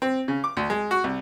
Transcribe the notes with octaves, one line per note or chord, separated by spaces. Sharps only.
C4
C#3
D6
D2
G#3
F#4
C2